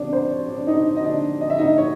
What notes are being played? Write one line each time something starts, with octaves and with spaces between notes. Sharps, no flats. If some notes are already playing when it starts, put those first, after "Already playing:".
Already playing: C3 B3 D4 D5
C5
C#5
D4 D5
D#4 D#5
D#5
D4 D5
D#5
E5
D#4 D#5
C#5